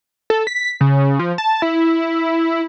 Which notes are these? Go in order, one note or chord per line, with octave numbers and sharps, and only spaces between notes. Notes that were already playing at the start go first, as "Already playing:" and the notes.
A4
B6
C#3
F3
A5
E4